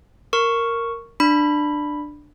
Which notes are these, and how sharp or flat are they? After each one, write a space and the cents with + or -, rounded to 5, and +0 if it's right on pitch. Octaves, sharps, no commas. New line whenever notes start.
A#4 -5 C#6 +0
D4 +15 B5 +0